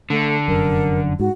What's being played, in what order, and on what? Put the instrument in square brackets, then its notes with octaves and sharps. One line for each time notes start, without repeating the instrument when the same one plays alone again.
[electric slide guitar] D3 [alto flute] A3
[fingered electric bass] F1 F#2 [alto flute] A#4
[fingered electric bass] G#2 [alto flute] F#4